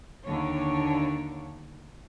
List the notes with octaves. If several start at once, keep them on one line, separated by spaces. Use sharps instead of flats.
D#2 D3 D4 C#5